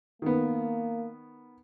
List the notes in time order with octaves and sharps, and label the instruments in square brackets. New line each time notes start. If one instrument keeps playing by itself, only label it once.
[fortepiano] D#3 B3 [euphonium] A#3